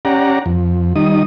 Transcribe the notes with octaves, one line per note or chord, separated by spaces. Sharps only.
C#4 G4 D5 F#5 A#5
F2
D#3 G3 D#4 D#6